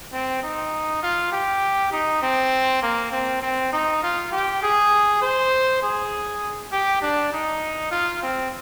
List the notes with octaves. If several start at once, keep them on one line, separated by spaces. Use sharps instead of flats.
C4
D#4
F4
G4
D#4
C4
A#3
C4
C4
D#4
F4
G4
G#4
C5
G#4
G4
D4
D#4
F4
C4